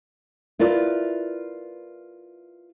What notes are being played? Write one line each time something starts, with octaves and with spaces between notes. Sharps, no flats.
E4 F4 A#4 B4 D5